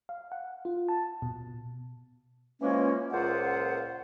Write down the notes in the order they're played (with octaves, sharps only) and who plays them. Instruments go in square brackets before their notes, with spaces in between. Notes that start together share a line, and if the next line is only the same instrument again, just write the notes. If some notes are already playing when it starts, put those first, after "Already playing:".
[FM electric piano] F5
F#5
F4
A5
B2
[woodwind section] E3 F3 G#3 A#3 C#4
C#2 A#2 F4 C5 F#5